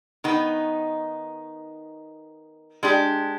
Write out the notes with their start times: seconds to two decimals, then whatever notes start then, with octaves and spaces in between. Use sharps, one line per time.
0.24 D#3 B3 D#4
2.83 G#3 D4 G4